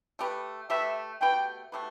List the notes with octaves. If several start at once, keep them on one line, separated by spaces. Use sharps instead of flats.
A3 G4 B4
A3 G4 B4 E5
B2 A3 G4 B4 G5
B2 A3 G4 B4